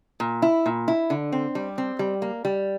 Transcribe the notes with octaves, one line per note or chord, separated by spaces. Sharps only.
A#2
E4
A#2
E4
D3
C4
G3
C4
G3
A#3
G3